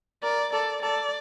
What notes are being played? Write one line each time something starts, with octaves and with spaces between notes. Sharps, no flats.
A#4 D5
A4 D5
A4 D5